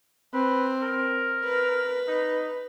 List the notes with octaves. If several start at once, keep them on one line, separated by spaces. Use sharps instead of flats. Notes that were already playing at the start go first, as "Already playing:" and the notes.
C4 B4
A#4
B4
D#4